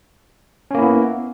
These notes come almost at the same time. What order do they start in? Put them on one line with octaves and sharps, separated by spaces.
C#4 A#3 E4 B3